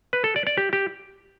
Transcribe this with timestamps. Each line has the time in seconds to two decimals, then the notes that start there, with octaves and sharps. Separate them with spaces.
0.13 B4
0.24 A4
0.36 D5
0.47 D5
0.58 G4
0.73 G4